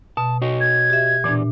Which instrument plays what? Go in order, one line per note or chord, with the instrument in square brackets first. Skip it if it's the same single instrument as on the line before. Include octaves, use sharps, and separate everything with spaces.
[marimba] B2 [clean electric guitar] A5
[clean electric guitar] F#4 C#5 D#5
[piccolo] G#6
[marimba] G4 E5
[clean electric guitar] E2 D5 [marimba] A#2 D4